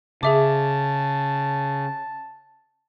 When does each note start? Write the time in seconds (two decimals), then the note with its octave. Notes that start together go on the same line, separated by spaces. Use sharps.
0.23 C#3 G#4 E5 A5 D6